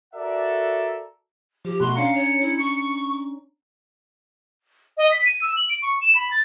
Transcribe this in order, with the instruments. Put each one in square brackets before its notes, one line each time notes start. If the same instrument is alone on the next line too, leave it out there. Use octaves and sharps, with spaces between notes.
[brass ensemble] F#4 A4 A#4 D5 E5 F#5
[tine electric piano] F3 [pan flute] G4
[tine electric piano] B2 A3 F#4 [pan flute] C6 [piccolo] F#6
[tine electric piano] C#4 D4 A#5 [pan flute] F5 [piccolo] C#7
[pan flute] C#5
E4
C#6
[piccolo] D#5
B6
D#7
E6
F#7
D7
C#6
E7
B5
A6